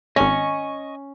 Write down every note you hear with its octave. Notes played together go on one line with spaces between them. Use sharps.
G#1 C#4 C#5 D#5 G#5 C#6